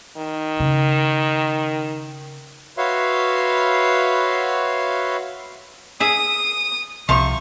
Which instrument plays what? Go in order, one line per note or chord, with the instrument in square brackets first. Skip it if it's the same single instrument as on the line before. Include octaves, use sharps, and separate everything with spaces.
[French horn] D#3
[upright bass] C#3
[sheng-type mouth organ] F#4 B4 C#5 E5 F5 C6
[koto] G#4 E5 [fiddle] D#6
[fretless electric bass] C2 [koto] C3 F3 F5 [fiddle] C#6